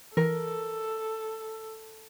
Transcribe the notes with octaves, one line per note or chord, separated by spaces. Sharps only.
E3 A4 A#4